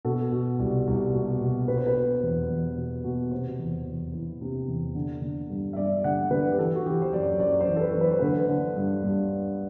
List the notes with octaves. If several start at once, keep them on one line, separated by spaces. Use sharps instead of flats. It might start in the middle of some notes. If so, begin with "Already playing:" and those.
B2 A4
B2
C2
C2
B2
B2
B2 B4
C5
B4
B2
E2
E2
B2
B2
C3 C5
E2
E2
E3
C3
E2
D3
D3
G2
E5
G2 D5
D3 F#5
D3 B4
G4
E3 A4
F#4
E3 G4
C5
F#2 D5
F#2 D5
C5
E3
A4
B4
E3
B4
C5
D3 B4
D3
G2
G2